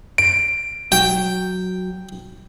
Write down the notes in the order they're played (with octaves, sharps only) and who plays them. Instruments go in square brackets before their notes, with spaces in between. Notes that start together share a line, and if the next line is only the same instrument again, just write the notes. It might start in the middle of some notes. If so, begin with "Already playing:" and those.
[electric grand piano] D7
[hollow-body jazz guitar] F#3 [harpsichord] G5